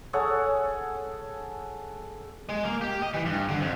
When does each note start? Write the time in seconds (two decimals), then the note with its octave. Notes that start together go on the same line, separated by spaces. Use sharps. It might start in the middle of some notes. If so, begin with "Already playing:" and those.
0.13 G#4 A4 C#5 F#5
2.49 G#3
2.64 A#3
2.81 G4
3.02 D#5
3.14 E3
3.25 G2
3.49 D3
3.61 F2